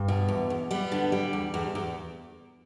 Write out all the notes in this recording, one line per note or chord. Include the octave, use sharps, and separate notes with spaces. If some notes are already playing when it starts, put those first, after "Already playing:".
Already playing: G2
B2
E2
E2
G3 B3
D3
G3
E2
E2
E2